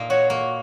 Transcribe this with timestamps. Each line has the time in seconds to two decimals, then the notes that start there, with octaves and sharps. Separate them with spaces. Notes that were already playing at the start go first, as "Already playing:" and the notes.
Already playing: A#2 A#3 D#4
0.10 F#4 C#5
0.30 A#3